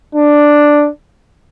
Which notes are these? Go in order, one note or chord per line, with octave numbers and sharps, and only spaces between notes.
D4